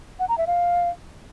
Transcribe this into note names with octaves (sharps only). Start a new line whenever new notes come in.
F#5
A#5
E5
F5